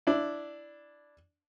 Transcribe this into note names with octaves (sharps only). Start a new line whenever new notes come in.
D4 E4